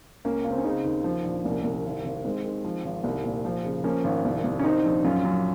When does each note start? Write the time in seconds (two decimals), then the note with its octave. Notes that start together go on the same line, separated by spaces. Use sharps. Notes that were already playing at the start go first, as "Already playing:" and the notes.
0.25 C#2 A#3 C#4
0.44 C#2
0.51 C4
0.58 C#4
0.64 C#3 C4 D#4
0.84 D#2
1.04 F3
1.24 A#1
1.45 C2 A#3 C#4
1.64 C2
1.85 G#1
2.05 G#1
2.24 D#3 G#3 C4
2.44 D#3
2.64 F3
2.84 G#1
3.04 C2
3.24 A#2
3.45 F3
3.65 C#3
3.84 F3 A#3 C#4
4.04 G#1
4.25 C2
4.44 C2
4.59 C#4
4.64 D#3 C4 D#4
4.84 A#1
5.04 F#2 C#4 F4
5.24 F#2